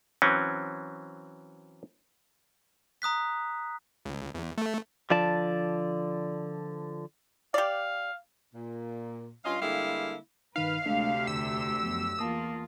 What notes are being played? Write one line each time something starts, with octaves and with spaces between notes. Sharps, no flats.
E3 F#3 C4 C#4
A#5 D#6 F#6 B6
C#2
E2
A3
D3 F3 D5 A5
G4 D5 F5
A#2
G2 C#4 F4 D#5 F5
D3 G3 G#3 A#3 E4 F5
G2 D#3 D#4 B4 F5
D2 C3 G#3 A3 D4 G4 E5
E2 D3 E6
F#2 F3 B3
E2 A#3 F4 A5 D#6